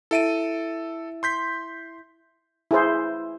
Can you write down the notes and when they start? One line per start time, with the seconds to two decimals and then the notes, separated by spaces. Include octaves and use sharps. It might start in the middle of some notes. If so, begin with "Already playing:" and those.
0.11 E4 A4 E5 D7 D#7
1.23 C6 G6 B6
2.71 E4 G#4 C5